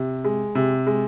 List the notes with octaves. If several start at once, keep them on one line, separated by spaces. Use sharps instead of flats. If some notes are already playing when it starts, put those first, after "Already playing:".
Already playing: C3
G#3
C3
G#3